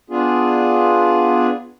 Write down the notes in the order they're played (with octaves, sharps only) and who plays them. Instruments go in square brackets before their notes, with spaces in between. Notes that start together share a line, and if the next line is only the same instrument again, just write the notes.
[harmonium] B3 D4 F4 G#4